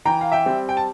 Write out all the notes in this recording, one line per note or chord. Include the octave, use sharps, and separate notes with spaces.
E3 G5 A#5
F5
E5 G5
G3 C4
G5
A5